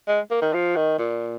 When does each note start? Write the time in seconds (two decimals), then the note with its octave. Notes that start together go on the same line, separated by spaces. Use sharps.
0.08 G#3
0.31 A#3
0.42 D#3
0.54 F3
0.76 D#3
0.99 A#2